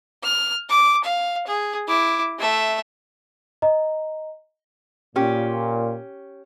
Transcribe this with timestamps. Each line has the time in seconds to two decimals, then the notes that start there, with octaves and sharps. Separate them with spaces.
0.23 F6
0.69 D6
1.04 F5
1.47 G#4
1.88 E4 D6
2.38 A3 E5
3.62 D#5 A#5
5.16 A#2 C#4 G4